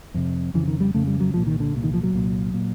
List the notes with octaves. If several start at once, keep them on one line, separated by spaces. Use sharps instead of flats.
F2 C3
F2 C#3 E3
D#3
G3
F2 C#3 A3
G3
F#3
C2 A#2 F3
D#3
D3
C2 A#2
D#3
F3
F#3
C2 A#2
A#2